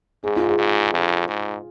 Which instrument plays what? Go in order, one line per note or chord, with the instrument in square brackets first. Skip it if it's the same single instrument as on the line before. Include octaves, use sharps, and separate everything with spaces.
[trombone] G#2 [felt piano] G#4
[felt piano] F4
G#4
[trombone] G#2
F2
G#2